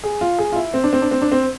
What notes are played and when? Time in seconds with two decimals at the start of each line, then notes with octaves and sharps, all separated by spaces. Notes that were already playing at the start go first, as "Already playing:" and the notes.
0.04 G#4
0.21 F4
0.39 G#4
0.52 F4
0.56 E4
0.74 C4
0.84 D4
0.93 C4
1.02 D4
1.11 C4
1.22 D4
1.32 C4